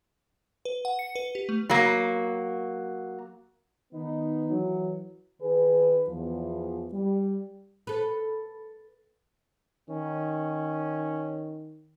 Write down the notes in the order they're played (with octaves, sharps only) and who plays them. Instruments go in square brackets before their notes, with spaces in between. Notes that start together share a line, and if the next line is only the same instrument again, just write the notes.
[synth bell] B4
F#5
C#7
B4
G4
A3
[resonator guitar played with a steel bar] F#3 A#3
[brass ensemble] D#3 B3 D#4
E3 F#3
[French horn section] D#3 G#4 B4
E2 F3
G3
[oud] A4 B4
[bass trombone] D#3 [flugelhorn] C#4